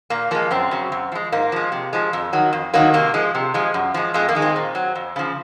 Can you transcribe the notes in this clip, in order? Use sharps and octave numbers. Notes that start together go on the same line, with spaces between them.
A#2 A#3
F3 G#3 A#3
F#2 C4
C#3 F#3
F#2
F3 G#3
G#2 A#3
F3 G#3
C3
F3 G#3
F2
D#3 F#3
F2
D#3 F#3 A#3
C3 A#3
F3 G#3
C3
F3 G#3
F#2
F3 G#3
F2 G#3
A#3
D#3 G#3
C4
A#2
F#3
F2
C#3 F3